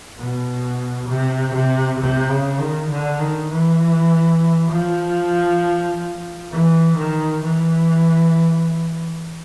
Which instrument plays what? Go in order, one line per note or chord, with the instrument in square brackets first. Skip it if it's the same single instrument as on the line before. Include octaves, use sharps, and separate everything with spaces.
[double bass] B2
C3
C3
C3
C#3
D#3
D3
D#3
E3
F3
E3
D#3
E3